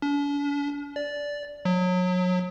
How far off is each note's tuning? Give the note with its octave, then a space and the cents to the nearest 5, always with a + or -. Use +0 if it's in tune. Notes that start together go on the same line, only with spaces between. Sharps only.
D4 -45
D5 -10
F#3 -30